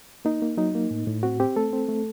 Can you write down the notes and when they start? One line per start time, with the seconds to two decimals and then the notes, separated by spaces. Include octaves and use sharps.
0.25 A#3 D#4
0.42 A#3
0.57 F#3 D#4
0.75 A#3
0.91 A2
1.07 A2
1.23 C4 F#4
1.40 C4 G4
1.56 A3 A4
1.73 C4
1.89 A3